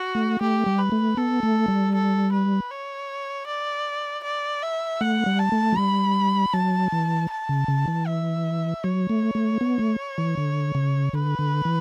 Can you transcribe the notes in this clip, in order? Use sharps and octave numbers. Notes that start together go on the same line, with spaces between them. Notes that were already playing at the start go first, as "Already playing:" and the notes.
Already playing: F#4
A3
A3 G4
G3
B4
A3
B3 A4
A3
G3
A4
B4
C#5
D5
D5
E5
A3 F#5
G3
A5
A3
F#3
G3 B5
F#3 A5
E3
A5
C#3
C#3
E3
E5
F#3 C#5
A3
A3
B3
A3
E3
D3
C#3
D3 B4
D3
E3